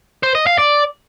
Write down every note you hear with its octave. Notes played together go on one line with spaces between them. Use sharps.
C5
D#5
F5
D5